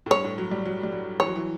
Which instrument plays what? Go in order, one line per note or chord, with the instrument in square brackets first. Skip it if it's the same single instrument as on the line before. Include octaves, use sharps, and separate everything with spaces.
[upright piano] A2
[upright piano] G2 [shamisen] C#5
[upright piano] A2
F#3
G3
F#3
G3
F#3
[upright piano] E3 [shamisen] C#5
[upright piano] F#3
E3